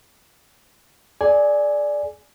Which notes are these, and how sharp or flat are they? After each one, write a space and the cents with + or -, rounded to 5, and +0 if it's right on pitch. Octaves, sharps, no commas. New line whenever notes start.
G#4 +40 D5 +0 G#5 +0